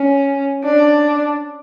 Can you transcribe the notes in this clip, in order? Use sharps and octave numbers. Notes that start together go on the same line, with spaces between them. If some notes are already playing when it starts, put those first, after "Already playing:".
Already playing: C#4
D4